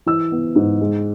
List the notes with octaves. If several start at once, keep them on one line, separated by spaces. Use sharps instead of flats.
E3 E6
B3
G#2
G#3